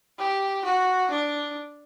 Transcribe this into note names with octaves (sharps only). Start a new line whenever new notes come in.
G4
F#4
D4